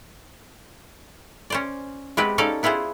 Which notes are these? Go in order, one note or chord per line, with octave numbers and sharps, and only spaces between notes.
C#4 C5 D5
G#3 B3 C4 G4 B4
C#4 D#4 A4 D5 F5
B3 E4 F4 G#4 C5